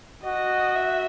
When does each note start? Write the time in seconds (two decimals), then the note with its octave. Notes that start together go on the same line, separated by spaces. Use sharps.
0.23 F#4 D#5
0.76 E5